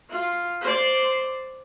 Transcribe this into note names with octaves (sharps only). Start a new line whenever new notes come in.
F4
C5 D5